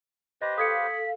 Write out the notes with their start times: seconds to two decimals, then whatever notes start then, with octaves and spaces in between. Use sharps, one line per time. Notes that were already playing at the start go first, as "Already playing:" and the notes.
0.42 G4 B4 C5 D#5 A#6
0.58 A4 F5 D#6 G#6 B6 C#7